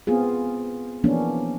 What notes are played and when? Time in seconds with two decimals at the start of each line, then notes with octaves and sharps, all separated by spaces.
0.07 B3 C4 F4 G#4
1.04 E3 F3 A#3 B3 C#4 D4